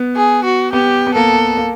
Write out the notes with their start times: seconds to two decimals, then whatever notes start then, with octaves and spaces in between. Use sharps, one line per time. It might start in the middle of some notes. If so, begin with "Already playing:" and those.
Already playing: B3
0.16 G#4
0.45 F#4
0.73 B3 G4
1.07 B3
1.15 A#3 A4
1.58 A#3